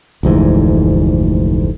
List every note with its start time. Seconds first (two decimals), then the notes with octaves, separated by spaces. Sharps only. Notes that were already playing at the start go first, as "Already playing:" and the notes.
0.23 F1 D2 G#2 E3